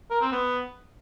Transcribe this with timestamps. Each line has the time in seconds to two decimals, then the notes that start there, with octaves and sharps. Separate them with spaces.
0.11 A#4
0.22 C4
0.32 B3